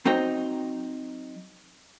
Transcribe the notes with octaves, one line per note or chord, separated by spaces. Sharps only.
F#3 C4 D#4 G5 A#5